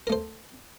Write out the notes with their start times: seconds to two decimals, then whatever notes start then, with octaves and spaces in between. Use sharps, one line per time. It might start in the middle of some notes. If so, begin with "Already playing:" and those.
0.07 A#4
0.10 A3
0.12 C5